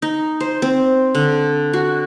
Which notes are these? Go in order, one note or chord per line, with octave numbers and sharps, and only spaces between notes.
D#4
C5
C4
D3
F#4